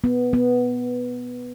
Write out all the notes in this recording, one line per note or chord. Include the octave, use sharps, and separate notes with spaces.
B3
B3